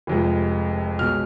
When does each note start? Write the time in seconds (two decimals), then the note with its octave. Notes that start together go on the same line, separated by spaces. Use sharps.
0.07 F1 F2 C3 F3 G#3
0.99 B1 B2 G#3 F6